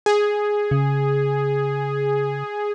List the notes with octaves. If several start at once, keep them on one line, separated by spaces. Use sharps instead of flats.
G#4
C#3